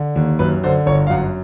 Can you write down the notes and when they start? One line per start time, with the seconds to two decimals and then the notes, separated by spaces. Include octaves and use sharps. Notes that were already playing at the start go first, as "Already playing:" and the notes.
Already playing: D3
0.16 D#2
0.39 F#2 B4
0.64 D3 C5
0.86 G1 C#5
1.07 F5
1.10 F#2 F#5